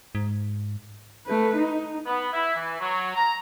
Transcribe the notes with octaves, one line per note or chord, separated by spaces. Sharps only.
G#2
A3 B4
D#4
B3
E4
E3
F#3
A#5